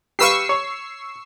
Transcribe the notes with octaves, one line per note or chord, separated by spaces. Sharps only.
G4 B4 F5 C#6 E6 C7
C#5